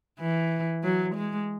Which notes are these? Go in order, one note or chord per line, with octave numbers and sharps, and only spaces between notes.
E3
F#3
G#3